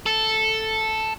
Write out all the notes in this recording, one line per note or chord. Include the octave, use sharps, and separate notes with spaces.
A4